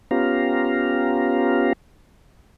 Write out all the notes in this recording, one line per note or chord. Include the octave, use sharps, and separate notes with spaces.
B3 C#4 F4 G4 F5 A#5